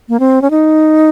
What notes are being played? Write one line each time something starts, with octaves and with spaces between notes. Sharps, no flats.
A#3
C4
C#4
D#4